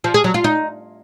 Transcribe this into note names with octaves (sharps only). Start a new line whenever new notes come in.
F3
G#4
F#3
F4
D#4